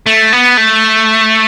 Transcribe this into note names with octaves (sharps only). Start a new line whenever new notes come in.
A3
B3
A3